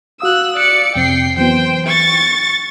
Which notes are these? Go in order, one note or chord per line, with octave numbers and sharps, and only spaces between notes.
F#4 F5 D#6 E6 F#6
D5 C#7
F2 C3 C4 G5 C7
E3 F#3 B3 C5 G5
C#6 A6